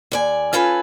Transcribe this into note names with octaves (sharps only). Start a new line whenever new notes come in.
D#2 D5 G#5
C#4 F4 A4 B4 G#5